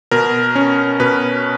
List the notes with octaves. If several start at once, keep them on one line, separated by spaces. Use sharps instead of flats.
B2 A#4
C#4
B2 B4